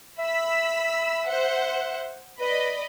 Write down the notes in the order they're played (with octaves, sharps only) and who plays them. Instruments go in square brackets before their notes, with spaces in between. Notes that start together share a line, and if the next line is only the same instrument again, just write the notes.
[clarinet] E5 [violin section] B5 E6 B6
[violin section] C5 F#5
[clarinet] B4 [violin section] D5 D#5 B5